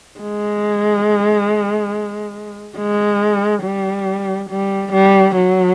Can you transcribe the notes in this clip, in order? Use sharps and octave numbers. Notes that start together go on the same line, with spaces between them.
G#3
G#3
G3
G3
G3
F#3